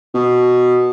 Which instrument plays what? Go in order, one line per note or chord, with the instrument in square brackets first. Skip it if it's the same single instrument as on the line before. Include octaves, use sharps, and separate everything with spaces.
[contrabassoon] B2